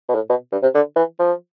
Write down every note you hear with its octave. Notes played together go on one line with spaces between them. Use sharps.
B2
A2
B2
G2
C3
D3
E3
F3